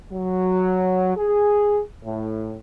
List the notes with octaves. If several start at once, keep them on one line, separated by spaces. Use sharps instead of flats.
F#3
G#4
A2